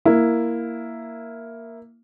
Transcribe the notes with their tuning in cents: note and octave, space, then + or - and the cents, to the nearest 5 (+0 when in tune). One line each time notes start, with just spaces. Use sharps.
A#3 +0 E4 +5